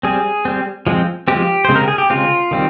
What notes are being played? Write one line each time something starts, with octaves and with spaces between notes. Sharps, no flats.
G3 C4 G#4
G3 C4
F3 G#3 C4
F3 G#3 C4 G4
C#3 G#3 C4 C5
A#4
G#4
G4
C#3 G#3 C4 F4
D#3 G3 C4